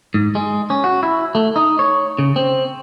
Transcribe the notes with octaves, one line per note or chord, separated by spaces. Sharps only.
G#2
G#3
C#4
F#4
E4
A3
D#4
C#5
C#3
C4